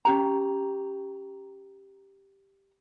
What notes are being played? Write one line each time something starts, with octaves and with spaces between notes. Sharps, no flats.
C#4 G4 A#5